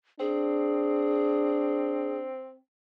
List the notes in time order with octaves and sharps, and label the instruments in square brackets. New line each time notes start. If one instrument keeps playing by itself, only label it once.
[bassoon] C4 [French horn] D4 [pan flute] G#4